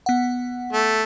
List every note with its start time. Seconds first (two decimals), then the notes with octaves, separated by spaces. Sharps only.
0.06 B3 F#5
0.73 A3